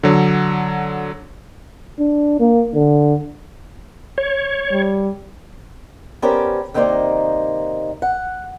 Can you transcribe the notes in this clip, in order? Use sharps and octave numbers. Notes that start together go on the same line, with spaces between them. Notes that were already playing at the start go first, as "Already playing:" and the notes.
D3 F#3
D4
A#3
D3
C#5
G3
B3 C#4 G4 A#4 C5 D5
C3 D#3 A#3 D#4 C5 D5
F#5